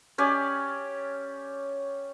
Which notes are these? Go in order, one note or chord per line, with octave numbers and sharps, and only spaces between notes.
C#4 G4 D5 G#5